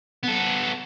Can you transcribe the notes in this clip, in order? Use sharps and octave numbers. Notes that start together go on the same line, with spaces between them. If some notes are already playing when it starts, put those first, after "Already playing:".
B3 A4